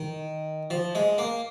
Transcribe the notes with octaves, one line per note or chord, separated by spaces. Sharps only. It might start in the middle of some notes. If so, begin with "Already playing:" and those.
Already playing: D#3
F3
G#3
A#3